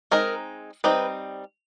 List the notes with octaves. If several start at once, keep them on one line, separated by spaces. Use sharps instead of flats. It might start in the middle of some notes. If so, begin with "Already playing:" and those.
G#3 C4 D#4 A#4
G3 C4 D#4 B4